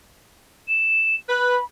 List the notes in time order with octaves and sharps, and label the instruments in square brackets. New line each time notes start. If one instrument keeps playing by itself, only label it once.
[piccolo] E7
[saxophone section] B4 [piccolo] B5